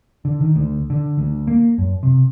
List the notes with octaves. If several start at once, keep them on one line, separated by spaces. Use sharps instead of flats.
D3
D#3
D2
D3
D2
A#3
F#2
C3